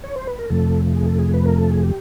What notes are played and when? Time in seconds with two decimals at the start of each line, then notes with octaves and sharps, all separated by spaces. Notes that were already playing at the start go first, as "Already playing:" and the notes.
0.04 C#5
0.16 C5
0.27 B4
0.39 A#4
0.50 F2 C3 F3 A3 A4
0.94 G#4
1.07 A4
1.19 G#4
1.34 B4
1.46 A#4
1.58 A4
1.71 G#4
1.83 G4